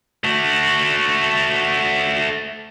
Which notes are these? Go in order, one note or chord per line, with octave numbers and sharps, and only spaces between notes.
A3 F#4